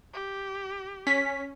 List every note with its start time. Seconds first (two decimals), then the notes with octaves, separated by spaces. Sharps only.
0.14 G4
1.07 C#4 B6